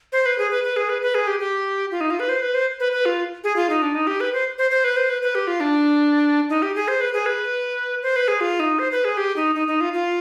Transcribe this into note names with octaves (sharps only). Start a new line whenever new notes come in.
C5
B4
G#4
B4
B4
G#4
B4
B4
G#4
G4
G4
F4
D#4
F4
B4
C5
B4
C5
B4
B4
F4
G#4
F4
D#4
D4
D#4
G4
B4
C5
C5
C5
B4
C5
B4
B4
G4
F4
D4
D#4
G4
G#4
C5
B4
G#4
B4
C5
B4
G#4
F4
D#4
C5
B4
G#4
G4
D#4
D#4
D#4
F4
F4